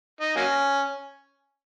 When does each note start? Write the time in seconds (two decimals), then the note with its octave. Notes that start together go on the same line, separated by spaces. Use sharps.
0.20 D#4
0.36 F#3 A#3 C#4